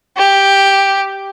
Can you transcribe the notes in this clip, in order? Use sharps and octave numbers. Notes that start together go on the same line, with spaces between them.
G4